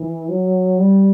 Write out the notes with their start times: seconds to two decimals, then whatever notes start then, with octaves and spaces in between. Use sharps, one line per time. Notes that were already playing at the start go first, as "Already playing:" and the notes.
Already playing: E3
0.29 F#3
0.79 G3